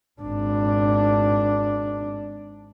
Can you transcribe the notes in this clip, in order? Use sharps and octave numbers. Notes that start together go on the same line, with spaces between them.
G#1 D4